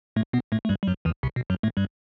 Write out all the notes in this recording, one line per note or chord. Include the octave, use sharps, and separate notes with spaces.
A2 A3
B2 B3
A2 A3
A3
G2 G3
G3
F#2 F#3
E2 E3
C2 C3
B2
F#2 F#3
A2 A3
G2 G3